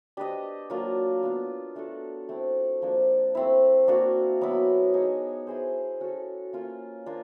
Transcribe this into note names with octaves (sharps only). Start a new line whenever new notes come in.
D4 G4 B4 D#5
F#3 A#3 D4 F4
B3 D4 F4
A3 D4 F#4 A4
A3 C4 E4
F3 A#3 D4
A3 C4 E4
A#3 D4 F#4
F#3 B3 E4
D#4 G#4 C#5
E4 G#4 C5
C#4 F#4 A4
A#3 C#4 F4
A#3 D4 F4